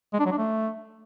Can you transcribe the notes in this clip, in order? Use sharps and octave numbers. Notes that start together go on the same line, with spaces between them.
G#3
D4
F#3
D4
A3